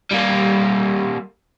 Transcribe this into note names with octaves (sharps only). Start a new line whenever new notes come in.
G3 A#3